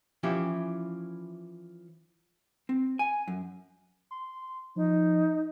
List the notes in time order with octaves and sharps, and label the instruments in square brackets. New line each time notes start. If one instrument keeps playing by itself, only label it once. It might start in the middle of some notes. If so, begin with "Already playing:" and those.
[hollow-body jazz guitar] E3 F3 C#4 E4 G4
C4
G#5
F#2
[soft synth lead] C6
[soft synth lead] F3 [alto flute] D#4